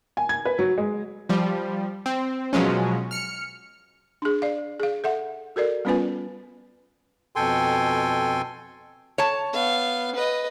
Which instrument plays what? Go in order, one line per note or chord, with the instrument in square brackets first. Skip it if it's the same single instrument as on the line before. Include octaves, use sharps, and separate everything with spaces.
[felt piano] G#5
G#6
B4
F#3
G#3
[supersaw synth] F3 G3
C4
B2 F3 F#3 G#3 C#4
F6 C#7
[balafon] D4 G#4
D5 F5
G#4 F5
A4 E5 F#5
F#4 A4 A#4 D5
G3 B3 C#4 F4 B4 G#5
[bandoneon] F2 B2 A4 G5 G#5 C6
[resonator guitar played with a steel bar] C#5 A5
[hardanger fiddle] B3 F5
B4 D#5